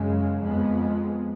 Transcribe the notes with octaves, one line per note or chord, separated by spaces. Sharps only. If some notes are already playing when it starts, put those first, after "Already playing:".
Already playing: F#2 C#3 G#3
F2 F3 G#3 B3